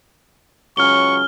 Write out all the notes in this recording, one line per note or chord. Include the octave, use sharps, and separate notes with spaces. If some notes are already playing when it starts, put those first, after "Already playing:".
C#2 F#3 C#4 C#6 F6 G7